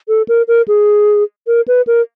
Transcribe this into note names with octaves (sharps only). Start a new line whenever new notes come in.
A4
A#4
A#4
G#4
A#4
B4
A#4